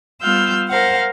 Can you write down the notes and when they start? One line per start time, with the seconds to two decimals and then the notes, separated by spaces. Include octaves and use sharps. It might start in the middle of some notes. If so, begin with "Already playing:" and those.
0.22 G3 B3 F4 F5 E6 G6
0.68 A#4 C5 F5 F#5